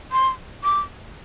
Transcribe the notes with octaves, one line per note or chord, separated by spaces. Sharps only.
C6
D6